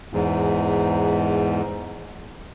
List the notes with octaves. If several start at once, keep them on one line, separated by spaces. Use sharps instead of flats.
E2 G#2